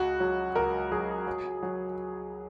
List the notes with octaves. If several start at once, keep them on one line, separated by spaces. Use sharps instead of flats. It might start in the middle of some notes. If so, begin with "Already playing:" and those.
Already playing: C#2 F#4
F#3
C#2 A#4
F#3 G#4
F#3
F#3